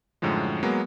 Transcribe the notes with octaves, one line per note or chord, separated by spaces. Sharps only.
F#2 A2 D3 F3 G#3
F#3 G#3 A#3 B3